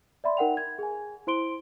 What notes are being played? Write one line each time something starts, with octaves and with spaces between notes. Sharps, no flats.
D5 E5 B5 C6
D#4 A#4 F#5 G5 F7
G#6
G#4 G#5
E4 C5 C6 D7 G7